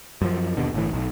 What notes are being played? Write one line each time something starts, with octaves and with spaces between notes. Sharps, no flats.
F#2 F3
D#2 B2 D3
G1 A2 E3
B1